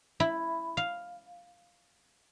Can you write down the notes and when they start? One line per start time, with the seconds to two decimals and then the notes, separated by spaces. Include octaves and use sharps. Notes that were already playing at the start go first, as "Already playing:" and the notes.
0.20 E4
0.77 F5